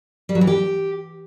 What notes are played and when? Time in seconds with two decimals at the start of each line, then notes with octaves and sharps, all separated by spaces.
0.29 G3
0.35 F#3
0.41 E3
0.47 G4